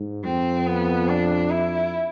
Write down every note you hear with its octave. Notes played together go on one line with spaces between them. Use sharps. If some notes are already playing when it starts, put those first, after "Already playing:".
Already playing: G#2
F2 C4
B3
D4
E4